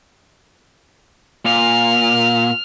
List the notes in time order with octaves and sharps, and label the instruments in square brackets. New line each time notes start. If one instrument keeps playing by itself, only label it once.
[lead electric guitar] A#2 [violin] F6